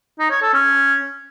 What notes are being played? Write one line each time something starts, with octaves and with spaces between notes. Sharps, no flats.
D#4
C#5
A4
C#4